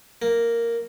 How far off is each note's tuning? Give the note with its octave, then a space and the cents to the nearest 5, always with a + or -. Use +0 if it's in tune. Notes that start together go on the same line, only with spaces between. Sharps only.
A#3 -5